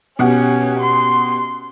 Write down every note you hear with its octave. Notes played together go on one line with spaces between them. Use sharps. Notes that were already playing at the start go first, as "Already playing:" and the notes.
B2 C#4 G4 F#5
C6